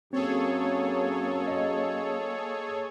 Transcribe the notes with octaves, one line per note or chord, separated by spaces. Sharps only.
F#2 A#3 C4 G#4 A4 C#5
D#5